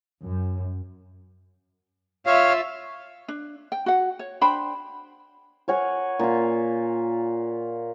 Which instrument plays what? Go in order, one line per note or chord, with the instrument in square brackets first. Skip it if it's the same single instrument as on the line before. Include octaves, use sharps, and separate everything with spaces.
[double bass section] F#2
[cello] F4 E5 [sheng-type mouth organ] C#5 F5
[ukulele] D4
G5
F#4 F#5
C#5
D4 C5 G5 B5
[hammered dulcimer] A#4 C#5 F#5 G#5
A#2 F4